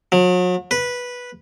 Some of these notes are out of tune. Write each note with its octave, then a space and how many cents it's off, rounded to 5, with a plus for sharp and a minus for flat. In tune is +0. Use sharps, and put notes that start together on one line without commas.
F#3 -40
B4 -10